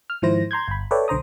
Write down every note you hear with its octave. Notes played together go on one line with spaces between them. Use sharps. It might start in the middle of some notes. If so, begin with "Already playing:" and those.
F6
G#2 D#3 F3 E4 C5 A#6
A#5 C6 G6 G#6
G1 B5
A4 B4 C#5 D5 E5 G5
B1 D3 C5 A#5 D#6